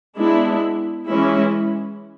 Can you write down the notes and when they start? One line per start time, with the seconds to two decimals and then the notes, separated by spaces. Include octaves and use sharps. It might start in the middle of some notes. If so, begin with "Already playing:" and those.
0.18 G#3 B3 D4 E4
1.08 E3 G#3 C#4 E4